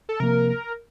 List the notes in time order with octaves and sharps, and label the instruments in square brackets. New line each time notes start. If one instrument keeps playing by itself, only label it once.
[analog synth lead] A4
[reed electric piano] C3 F3 A#3 [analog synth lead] A#4